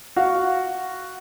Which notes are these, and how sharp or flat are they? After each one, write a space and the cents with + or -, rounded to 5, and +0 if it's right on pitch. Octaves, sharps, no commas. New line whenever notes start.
F#4 +0 F5 +0